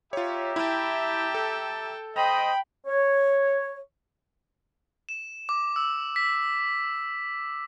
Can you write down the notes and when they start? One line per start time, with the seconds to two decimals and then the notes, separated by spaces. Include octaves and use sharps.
0.13 F4 G4 C#5 E5 A#5
0.56 E4 G5 A5
1.35 A4
2.16 C5 D#5 G5 B5
2.87 C#5
5.09 E7
5.49 D6
5.76 E6
6.16 B6